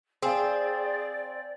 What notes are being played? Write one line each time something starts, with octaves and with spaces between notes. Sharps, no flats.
C4 G#4 D5 F5 G#5 C6